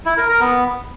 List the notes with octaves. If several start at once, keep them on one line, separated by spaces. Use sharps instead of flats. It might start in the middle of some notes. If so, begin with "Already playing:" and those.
E4
A#4
A#4
B3